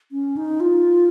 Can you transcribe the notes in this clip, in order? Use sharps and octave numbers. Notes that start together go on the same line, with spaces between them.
C#4
D#4
F4